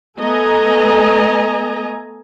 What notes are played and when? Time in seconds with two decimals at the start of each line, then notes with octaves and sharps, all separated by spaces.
0.19 A3 B3 A4 D#5 G#5 A#5